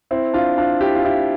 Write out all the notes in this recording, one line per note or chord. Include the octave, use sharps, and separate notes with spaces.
C4 E4
D4 F4
D4 F4
E4 G4
F4
E4 G4